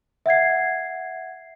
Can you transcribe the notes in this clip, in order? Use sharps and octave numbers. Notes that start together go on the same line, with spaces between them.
E5 F#5 G#6 C7